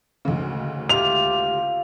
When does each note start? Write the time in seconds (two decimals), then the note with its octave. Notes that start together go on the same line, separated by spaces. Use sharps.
0.25 D2 G#2 C#3
0.89 F4 G4 E5 F7